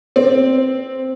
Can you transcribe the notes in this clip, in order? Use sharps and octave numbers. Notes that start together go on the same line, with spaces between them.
C4